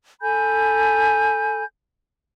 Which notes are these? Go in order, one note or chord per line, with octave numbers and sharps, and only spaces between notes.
A4 G#5 B5 G6